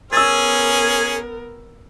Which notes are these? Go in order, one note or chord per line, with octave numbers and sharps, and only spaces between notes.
B3 C#4 G#4 A#4 G#5 E6 A6